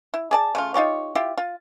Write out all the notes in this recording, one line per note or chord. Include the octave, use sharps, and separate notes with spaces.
E4
G#4 D5 A5
C#3 A3 F4
D#4 F4 G4 C#5
E4 F4 G4
F4